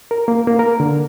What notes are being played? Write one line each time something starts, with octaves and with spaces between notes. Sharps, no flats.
A#4
A#3
A#3
A#4
D3